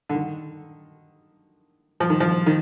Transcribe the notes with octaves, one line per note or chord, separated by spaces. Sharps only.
D3
D#3
F3
D#3
F3
D#3